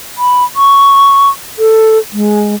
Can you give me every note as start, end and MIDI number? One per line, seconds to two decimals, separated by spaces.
0.18 0.44 83
0.56 1.30 85
1.58 1.98 69
2.13 2.55 56